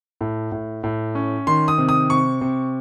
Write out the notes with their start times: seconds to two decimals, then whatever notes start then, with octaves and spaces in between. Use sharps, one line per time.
0.21 A2
0.52 A2
0.84 A2
1.15 C#4
1.47 D#3 C6
1.68 D#6
1.78 C3
1.89 D#6
2.10 C3 C#6
2.41 C3